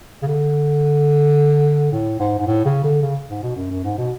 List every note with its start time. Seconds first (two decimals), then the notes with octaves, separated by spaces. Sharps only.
0.22 C#3
0.27 D3
1.92 A2
2.20 G#2
2.39 G#2
2.47 A2
2.65 C#3
2.84 D3
3.02 C#3
3.29 G#2
3.43 B2
3.56 F#2
3.71 F#2
3.84 G#2
3.98 B2